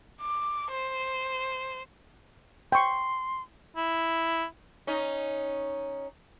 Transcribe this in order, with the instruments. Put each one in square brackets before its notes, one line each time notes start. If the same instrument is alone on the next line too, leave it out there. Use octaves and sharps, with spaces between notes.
[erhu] D6
C5
[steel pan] G5 C#6 [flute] C6
[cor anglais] E4
[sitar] C#4 D#4